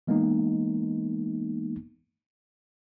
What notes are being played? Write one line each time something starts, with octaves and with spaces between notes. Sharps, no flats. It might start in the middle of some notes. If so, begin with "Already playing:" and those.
E3 G#3 A#3 B3 D#4